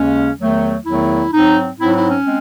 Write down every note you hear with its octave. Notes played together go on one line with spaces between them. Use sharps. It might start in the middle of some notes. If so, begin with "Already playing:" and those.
Already playing: D#2 C#3 G#3 C#4
E2 D#3 F#3 A3
E2 D#3 F#3 A3 E4
G#2 F#3 C4 D#4
G#2 F#3 C4 E4
E4
C#4
G#3 C4